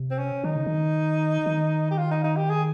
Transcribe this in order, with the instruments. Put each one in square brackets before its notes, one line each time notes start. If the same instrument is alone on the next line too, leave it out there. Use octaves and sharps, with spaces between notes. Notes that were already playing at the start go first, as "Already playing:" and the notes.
Already playing: [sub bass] C3
[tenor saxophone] C4
C#4
[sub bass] D#3 [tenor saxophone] D#4
[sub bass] C#3
D#3
D#3
[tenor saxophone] G4
F4
D#4
D#4
G4
G#4